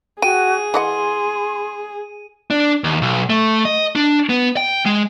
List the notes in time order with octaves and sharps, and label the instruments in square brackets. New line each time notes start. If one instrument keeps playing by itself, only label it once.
[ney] F#4 [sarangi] G#4 [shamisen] G5 [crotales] D#7
[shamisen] E3 D#5 F#5 [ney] C6
[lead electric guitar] D4
D#2
B1
A3
D#5
D4
B3
G5
G#3